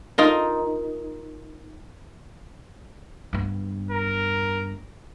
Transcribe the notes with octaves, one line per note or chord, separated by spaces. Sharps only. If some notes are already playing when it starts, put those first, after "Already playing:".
D#4 F4 A#4
G2 B3
A#4